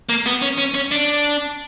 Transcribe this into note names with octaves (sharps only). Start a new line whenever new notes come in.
A#3
B3
C#4
C#4
C#4
D4